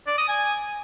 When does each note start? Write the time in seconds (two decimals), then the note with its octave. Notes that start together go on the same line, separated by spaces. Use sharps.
0.07 D5
0.18 D#6
0.29 G#5